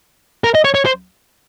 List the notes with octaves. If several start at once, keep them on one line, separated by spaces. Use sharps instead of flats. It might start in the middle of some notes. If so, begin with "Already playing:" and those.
A#4
D#5
C#5
C#5
C5